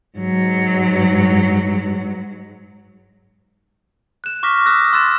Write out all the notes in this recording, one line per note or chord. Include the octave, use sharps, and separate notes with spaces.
G#2 F#3
F#6 E7
C#6 D6 F6 A#6 B6
D#6 E6 F#6 A#6
C6 E6 F#6 A6 E7